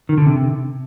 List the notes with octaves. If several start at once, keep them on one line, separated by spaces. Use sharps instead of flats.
D#3
D3
C3